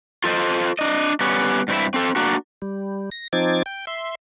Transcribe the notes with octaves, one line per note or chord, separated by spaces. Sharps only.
F4 A4 C5 D#5
D4 D#5
G3 B3 C#4
G2 C4 E4 E5
C4 A4
A#3 D4 F#4
G3
A#6
F3 C4 D#4 D6 G#6 A6
G5
E5 C6